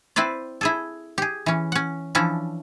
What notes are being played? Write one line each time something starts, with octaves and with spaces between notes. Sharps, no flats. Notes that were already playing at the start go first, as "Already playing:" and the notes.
C4 E4 B4 C5 D5
E4 G#4 A4
G4 G#4
E3 C#4
C#4 F#5
E3 F3 C#4 D4 E4